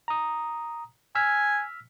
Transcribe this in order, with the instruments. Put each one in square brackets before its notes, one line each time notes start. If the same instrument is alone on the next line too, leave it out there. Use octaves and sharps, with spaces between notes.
[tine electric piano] A#5 D#6
[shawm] G#5 [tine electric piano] E6 F6 B6